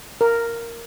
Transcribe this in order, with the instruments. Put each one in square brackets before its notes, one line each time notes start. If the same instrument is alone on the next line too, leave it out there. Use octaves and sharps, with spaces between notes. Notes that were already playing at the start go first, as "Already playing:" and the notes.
[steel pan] A#4